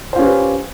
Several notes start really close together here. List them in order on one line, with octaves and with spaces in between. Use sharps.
C5 F4 C#4 G4 B4